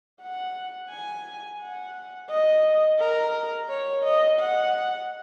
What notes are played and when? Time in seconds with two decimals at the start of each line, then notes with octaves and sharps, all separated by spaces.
0.21 F#5
0.90 G#5
1.60 F#5
2.30 D#5
3.00 A#4
3.69 C#5
4.04 D#5
4.39 F#5